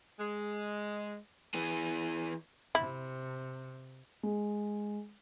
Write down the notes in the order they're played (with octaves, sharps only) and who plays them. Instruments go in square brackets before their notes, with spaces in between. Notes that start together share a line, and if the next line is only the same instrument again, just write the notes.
[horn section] G#3
[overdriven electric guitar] E3 G#4
[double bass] C3 [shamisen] E4
[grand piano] G#3